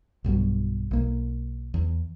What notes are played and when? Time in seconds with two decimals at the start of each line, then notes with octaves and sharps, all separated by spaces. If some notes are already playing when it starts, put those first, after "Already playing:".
0.24 B1 G2 B2 F#3
0.91 B1 A#3
1.74 E2